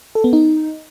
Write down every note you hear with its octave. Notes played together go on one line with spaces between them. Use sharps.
A4
B3
D#4